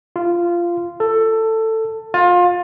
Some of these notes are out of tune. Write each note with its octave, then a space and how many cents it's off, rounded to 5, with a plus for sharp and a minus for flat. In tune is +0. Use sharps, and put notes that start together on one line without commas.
F4 -15
A4 +15
F4 +25